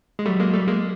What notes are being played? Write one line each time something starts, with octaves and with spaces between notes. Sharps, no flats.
G#3
F#3 G3 A3
G#3 A#3
G3 A3
G#3 A#3